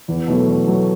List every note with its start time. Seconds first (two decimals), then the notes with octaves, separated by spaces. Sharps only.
0.08 E2
0.28 B2 F#3 A3
0.46 E2
0.66 B2 F#3 A3